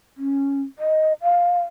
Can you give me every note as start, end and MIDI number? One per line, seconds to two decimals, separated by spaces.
0.17 0.62 61
0.79 1.13 75
1.22 1.59 77